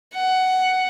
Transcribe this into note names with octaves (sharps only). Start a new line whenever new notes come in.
F#5